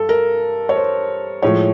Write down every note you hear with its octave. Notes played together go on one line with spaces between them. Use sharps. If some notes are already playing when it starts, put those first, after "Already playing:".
Already playing: G2 A4
A#4
C#5
C5
A2 F3 G#3 C#5